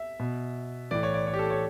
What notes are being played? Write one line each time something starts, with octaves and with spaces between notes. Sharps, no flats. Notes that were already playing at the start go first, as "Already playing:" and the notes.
Already playing: E5
B2
A2 E3 D5
C#5
D5
C#5
G4
A4
C#5